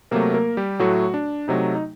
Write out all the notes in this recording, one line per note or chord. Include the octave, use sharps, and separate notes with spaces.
C3 F#3 A3 A#3 A#4
A#3 A#4
G3 G4
A2 F#3 A3 F#4
D4
C3 F#3 A3 D#4
D#4